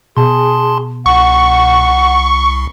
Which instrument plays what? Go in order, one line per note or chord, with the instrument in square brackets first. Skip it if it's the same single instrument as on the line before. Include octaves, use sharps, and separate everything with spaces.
[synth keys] B2 [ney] G#4 [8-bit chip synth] A5 C6
[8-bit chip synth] C2 [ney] F#5 [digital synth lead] C#6